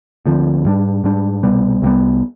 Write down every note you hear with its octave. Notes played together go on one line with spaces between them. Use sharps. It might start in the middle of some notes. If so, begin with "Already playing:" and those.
D2 D3 F3 C4
G#2 G3 D4
G#2 G3 D4
C2 B2 G3 B3
C2 B2 G3 B3